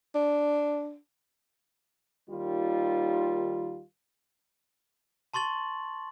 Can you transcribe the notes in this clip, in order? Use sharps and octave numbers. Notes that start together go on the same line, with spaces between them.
D4
D#2 D#3 G3 F4
A5 C6 C#6 A6 F#7